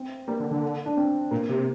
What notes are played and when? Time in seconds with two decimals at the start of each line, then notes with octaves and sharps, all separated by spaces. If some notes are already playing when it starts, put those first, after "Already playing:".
Already playing: C4
0.28 G3 A#3
0.40 D3
0.51 D3
0.85 D4
0.97 C4
1.31 A#2 A#3
1.49 C3